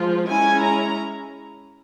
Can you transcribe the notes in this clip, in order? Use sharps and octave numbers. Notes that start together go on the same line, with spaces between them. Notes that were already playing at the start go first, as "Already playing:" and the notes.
Already playing: F3 G#3 F4
G#3 C#4 E4 G#5
A#5